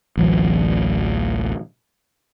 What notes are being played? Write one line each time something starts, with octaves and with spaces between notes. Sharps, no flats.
A1 D2 E3 F#3